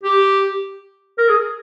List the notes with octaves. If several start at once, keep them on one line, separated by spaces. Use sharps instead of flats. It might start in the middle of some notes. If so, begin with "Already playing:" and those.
G4
A#4
G#4